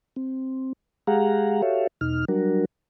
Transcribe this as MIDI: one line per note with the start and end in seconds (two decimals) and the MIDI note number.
0.16 0.73 60
1.07 1.62 56
1.07 1.62 67
1.07 1.62 68
1.07 1.62 77
1.07 1.62 78
1.07 1.62 82
1.62 1.87 66
1.62 1.87 67
1.62 1.87 69
1.62 1.87 73
1.62 1.87 76
1.62 1.87 77
2.01 2.25 40
2.01 2.25 47
2.01 2.25 63
2.01 2.25 89
2.28 2.65 54
2.28 2.65 55
2.28 2.65 62
2.28 2.65 66
2.28 2.65 70